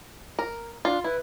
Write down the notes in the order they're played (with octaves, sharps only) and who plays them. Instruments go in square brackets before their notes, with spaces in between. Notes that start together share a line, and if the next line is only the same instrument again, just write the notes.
[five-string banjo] A#4
[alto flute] D4 [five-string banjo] F4
[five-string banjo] E4 [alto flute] B4